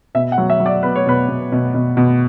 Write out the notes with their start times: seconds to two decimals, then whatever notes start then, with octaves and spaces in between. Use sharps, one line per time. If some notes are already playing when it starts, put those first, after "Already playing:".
0.15 B2 E5
0.32 F#5
0.38 F#3
0.50 E5
0.60 F#3
0.66 D5
0.83 B3 B4
0.96 C#5
1.06 B2 B4
1.28 B2
1.52 B2
1.74 B2
1.97 B2